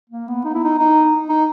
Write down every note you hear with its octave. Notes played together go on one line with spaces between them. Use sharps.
A#3
B3
D#4
E4
D#4
D#4
D#4